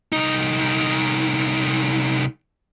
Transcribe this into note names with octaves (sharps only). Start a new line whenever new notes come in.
C2 D#4